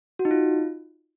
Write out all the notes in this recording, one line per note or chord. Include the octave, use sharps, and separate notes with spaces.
F#4
D#4
F4